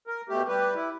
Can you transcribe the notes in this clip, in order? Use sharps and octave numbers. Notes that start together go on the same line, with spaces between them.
A#4
B2 A3 G4
G3 G4 B4
E4